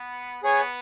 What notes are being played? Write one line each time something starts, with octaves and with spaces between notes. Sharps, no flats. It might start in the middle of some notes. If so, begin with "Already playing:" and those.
Already playing: B3
B3 G#4 C#5 G#5